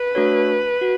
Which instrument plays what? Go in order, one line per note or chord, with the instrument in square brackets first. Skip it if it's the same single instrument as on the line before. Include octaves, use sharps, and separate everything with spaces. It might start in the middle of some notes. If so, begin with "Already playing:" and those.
Already playing: [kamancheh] B4
[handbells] A3 D4 F#4 A4 C#5
F#4